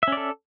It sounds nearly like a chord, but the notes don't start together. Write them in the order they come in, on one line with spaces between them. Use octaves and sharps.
E5 C#4 D5 A4